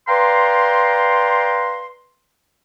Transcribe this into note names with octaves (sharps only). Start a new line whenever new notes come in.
B4 D5 F5 G5 A#5 C6